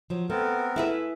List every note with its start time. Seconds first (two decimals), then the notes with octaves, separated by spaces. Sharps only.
0.10 F3 F#3
0.30 A3 B3 C4 A#4
0.76 A3 E4 G#4 B4 E5